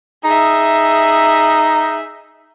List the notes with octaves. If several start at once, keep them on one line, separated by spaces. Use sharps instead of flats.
D#4 G#4 E5